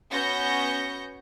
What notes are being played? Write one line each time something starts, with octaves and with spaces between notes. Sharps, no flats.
B3 C#4 F#4 G6 A#6 C#7